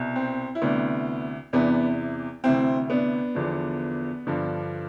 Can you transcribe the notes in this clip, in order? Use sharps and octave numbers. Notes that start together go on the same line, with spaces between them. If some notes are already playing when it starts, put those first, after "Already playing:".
Already playing: C2 B2
C4
E4
D2 C3 E3 B3 D4
E2 C3 E3 B3 D4
D2 C3 E3 C4 E4
B3 D4
E2 D3 F3
G2 D3 F3